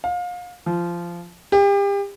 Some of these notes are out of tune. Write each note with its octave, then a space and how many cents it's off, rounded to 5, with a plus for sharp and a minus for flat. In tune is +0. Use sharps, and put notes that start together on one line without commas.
F5 +30
F3 -15
G4 +35